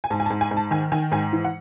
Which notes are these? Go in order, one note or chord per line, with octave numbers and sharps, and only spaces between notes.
G#5
G#2 A5
G#5
A5
G#2
G#5
G#2
A5
D#3 G#5
D#3 G#5
G#2 G#5
E3
F#5